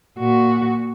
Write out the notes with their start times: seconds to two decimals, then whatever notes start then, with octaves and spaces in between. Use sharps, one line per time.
0.18 A#2 F#4